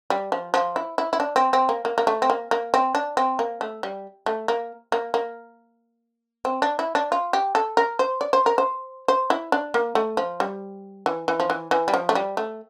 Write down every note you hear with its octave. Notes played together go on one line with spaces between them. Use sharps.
G3
F3
F3
E4
E4
E4
D4
C4
C4
A#3
A#3
A#3
A3
C4
A#3
A#3
C4
D4
C4
A#3
A3
G3
A3
A#3
A#3
A#3
C4
D4
E4
D4
F4
G4
A4
A#4
C5
D5
C5
A#4
C5
C5
E4
D4
A#3
A3
F3
G3
E3
E3
F3
E3
E3
G3
F3
A3
G3
A3